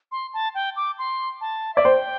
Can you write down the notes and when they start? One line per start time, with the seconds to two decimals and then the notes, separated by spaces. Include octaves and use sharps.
0.12 C6
0.34 A5
0.55 G5
0.76 D6
0.99 C6
1.41 A5
1.75 D5 E5
1.85 C5 G5